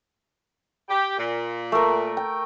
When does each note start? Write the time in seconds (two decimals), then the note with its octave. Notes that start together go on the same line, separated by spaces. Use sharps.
0.89 G4
1.18 A#2
1.72 A3 A#4
2.17 G5